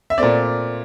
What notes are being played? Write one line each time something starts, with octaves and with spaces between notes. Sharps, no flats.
E5
A#2 A3 C4 D5